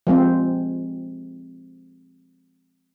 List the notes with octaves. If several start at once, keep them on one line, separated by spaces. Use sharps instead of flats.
F3 G#3 C4